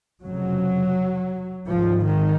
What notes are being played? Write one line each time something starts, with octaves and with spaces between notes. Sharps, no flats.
F1 F2 C#3 F#3
G#1 G#2 F3
D#3